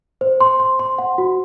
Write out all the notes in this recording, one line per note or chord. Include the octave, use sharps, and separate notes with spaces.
C5
C6
C6
C6
F#5
F#4